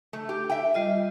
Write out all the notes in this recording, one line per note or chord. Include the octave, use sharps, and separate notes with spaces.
A3
G4
E5 G5
G3 F4 D#5